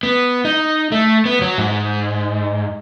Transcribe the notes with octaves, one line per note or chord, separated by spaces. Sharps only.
B3
D#4
A3
B3
F#3
G#2